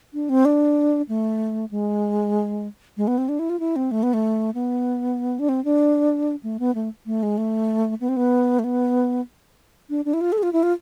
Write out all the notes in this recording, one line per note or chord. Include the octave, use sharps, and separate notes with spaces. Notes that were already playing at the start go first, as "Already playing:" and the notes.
D4
C4
D4
A3
G#3
G#3
B3
C4
D4
E4
F4
E4
C4
A3
B3
A3
B3
D4
C4
D4
A3
B3
A3
A3
G#3
A3
B3
C4
B3
A3
B3
D4
D4
E4
F4
A4
G#4
F4
E4
F4